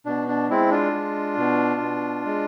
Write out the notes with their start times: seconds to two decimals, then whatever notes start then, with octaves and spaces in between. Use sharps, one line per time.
0.06 B2 D4
0.28 D4
0.50 G#3 C4 E4
0.71 D4 F4
0.93 G#3
1.37 B2
1.81 B2
2.25 G#3